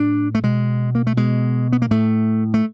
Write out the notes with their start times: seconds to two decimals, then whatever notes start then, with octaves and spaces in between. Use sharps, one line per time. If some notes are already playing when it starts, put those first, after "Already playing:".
Already playing: A2 D4
0.35 A3
0.43 B2 G#3
0.95 A#3
1.07 A3
1.17 B2 G#3
1.72 B3
1.82 A#3
1.91 A2 A3
2.54 A3